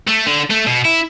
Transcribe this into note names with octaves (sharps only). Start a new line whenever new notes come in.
A3
D3
A3
B2
E4